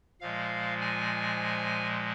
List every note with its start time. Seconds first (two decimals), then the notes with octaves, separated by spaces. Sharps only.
0.21 A#2 F3 G#3 F5
0.81 G#5